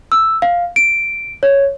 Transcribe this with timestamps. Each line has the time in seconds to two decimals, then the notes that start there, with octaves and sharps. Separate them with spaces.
0.12 E6
0.42 F5
0.76 D7
1.43 C#5